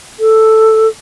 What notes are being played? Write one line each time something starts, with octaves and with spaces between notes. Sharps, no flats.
A4